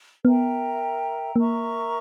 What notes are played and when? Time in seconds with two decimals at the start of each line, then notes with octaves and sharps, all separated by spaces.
0.25 B3 A#4 E5 G5 A#5
1.35 A#3 A#4 E5 A#5 C#6